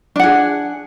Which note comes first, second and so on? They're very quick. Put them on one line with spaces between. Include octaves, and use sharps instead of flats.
D4 F#5 G#4